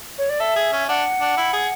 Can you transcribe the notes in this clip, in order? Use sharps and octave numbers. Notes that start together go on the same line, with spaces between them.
C#5
D5
A4 E5
G#4
C#4
D4 F#5
D4
E4
G#4